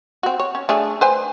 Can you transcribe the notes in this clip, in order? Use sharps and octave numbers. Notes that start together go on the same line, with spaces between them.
C4 F#4
C#5
C#4
A3 D4 G#4
B4 C5 G#5